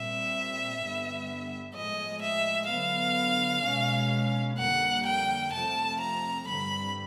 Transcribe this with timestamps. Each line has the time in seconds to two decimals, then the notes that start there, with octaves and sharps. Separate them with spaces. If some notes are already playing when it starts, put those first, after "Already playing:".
Already playing: A#2 G3 C4 E5
0.81 G2 D3 G3 B3
1.75 A2 F3 G#3 D#5
2.22 E5
2.69 D3 F#3 B3 F5
3.64 B2 G#3 C#4
4.58 F2 D3 G3 A#3 F#5
5.06 G5
5.53 F2 C3 F3 A3 C4 A5
6.00 A#5
6.47 G2 D3 G3 C4 B5